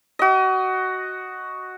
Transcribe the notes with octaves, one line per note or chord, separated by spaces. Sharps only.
F#4 D#5